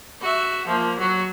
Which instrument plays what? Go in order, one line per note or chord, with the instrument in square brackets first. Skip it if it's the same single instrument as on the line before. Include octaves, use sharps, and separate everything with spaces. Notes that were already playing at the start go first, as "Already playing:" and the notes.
[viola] F#4 E5
F3 A#3
F#3 F#4